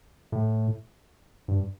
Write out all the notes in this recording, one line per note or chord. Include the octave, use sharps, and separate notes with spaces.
A2
G2